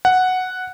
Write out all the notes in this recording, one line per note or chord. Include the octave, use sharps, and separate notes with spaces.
F#5